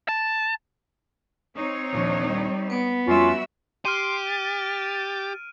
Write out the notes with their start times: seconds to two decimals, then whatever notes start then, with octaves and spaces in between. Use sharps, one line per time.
0.09 A5
1.56 C4 D#4 C#5
1.93 D#2 A#2 F3 D4
2.26 G3
2.70 B3 C#7 D7
3.07 F2 G3 C#4 F4 F#4 E5
3.85 G4 C6 F6 D7 D#7
4.26 A6